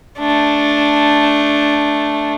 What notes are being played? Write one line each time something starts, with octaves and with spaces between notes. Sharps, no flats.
A3 D4